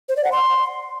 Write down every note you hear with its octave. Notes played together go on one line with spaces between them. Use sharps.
C5
D5
F#5
C6